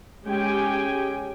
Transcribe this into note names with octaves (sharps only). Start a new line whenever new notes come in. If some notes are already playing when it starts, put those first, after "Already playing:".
G#3 C#4 G4 G5 G#5